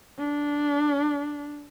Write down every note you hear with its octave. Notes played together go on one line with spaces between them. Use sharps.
D4